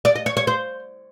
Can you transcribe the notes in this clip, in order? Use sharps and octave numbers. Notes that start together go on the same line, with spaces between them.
D5
D#5
C#5
C#5
C5